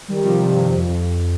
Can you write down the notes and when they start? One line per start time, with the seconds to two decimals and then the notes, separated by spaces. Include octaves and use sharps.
0.08 D#3 G3
0.23 C3 F3
0.39 G2 C3
0.54 G2
0.69 F2